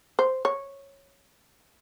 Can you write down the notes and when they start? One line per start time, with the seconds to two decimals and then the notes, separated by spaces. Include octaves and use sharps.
0.19 C5
0.45 C#5